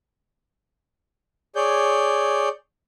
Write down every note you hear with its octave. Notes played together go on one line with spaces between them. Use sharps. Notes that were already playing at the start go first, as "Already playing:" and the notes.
G#4 C#5 D5 G6